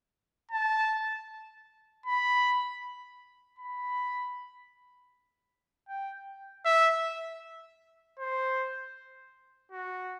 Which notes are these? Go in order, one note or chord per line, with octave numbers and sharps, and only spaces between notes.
A5
B5
B5
G5
E5
C5
F#4